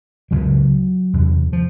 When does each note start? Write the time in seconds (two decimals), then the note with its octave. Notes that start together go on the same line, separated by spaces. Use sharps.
0.31 C#2 C#3 F#3
1.13 E2 C3
1.53 F3